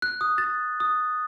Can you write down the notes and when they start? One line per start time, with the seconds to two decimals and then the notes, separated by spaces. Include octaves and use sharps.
0.02 F#6
0.21 D#6
0.38 A6
0.80 D#6